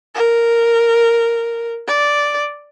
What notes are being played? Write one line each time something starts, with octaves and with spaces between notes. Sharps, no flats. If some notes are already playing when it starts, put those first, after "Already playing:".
A#4
D5